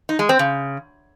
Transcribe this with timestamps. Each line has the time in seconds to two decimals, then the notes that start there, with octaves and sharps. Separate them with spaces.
0.09 D#4
0.19 G#3
0.29 C4
0.39 C#3